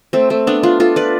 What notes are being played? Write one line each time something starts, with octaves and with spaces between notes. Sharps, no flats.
A3 C4
A3 C4
B3 D4
D4 F4
F4 A4
B4 D5